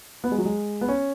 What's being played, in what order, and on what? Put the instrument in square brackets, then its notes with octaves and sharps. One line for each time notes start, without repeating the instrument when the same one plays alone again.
[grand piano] B3
G#3
F#3
G#3
B3
C#4